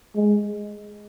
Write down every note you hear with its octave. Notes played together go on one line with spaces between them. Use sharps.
G#3